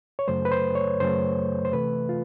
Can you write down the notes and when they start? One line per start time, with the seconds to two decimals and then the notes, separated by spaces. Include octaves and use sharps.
0.19 C#5
0.28 F#2 C#3 F#3 A3 C5
0.45 B4
0.52 C5
0.75 C#5
1.00 F#2 C#3 F#3 A3 C5
1.65 C5
1.73 C3 E3 A3 B4
2.09 F4